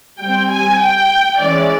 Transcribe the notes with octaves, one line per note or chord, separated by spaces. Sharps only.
G3 C4 G5
G#5
G5
E3 G#3 C#4 D5